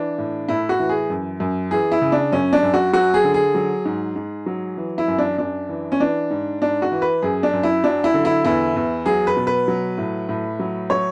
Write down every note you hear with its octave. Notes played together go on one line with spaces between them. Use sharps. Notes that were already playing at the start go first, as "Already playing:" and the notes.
Already playing: E3 D4
A2
A2 E4
F#4
E3
G#4
F#2
F#2
E3 G#4
E4
C#3
D4
F#2 C#4
D4
F#2
F#4
F#3 F#4
G#4
D3
G#4
F#3
G#2
G#2
F#3
E3
E4
F#2
D4
F#2 D4
E3
C#4
E3 D4
G#2
G#2 D4
F#4
E3
B4
F#2 G#4
D4
F#2
E4
F#3 D4
E4
D3
E4
E2 E4
E2
F#3 G#4
B4
B2
B4
F#3
A2
A2
F#3
F#3 C#5